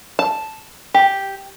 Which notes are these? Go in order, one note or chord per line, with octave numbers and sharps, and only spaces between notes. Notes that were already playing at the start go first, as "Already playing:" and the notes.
A5
G4